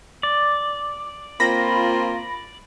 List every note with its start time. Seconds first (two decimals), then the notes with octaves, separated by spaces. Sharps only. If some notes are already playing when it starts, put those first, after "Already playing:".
0.23 D5
1.40 A#3 C4 F4 B5 A#6